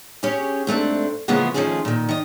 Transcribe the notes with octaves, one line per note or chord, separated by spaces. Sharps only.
C#4 G4 G#4 C#5
G#2 A3 C4 D4
C#3 E3 F3 G#3 A#3 B3
D#3 F3 A3 C#4 F4 G#4
A#2 D#3
D#3 D#5